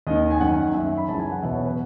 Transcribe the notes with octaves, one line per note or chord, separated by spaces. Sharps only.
D#2 D#3 D#5
G#5
F#2 D#3 F#5
F#2 D#3 E5
B5
F#2 C#3 E3 A5
G#5
F#5
E2 B2 E5
C#5
B4